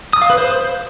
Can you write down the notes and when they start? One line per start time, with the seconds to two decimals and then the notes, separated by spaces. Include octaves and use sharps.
0.13 D#6
0.22 F5
0.30 B4
0.38 C5